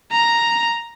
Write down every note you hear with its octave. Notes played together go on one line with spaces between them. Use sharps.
A#5